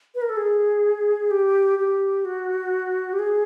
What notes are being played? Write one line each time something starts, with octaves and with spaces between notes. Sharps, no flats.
B4
A#4
A4
G#4
G4
G4
F#4
G4
G#4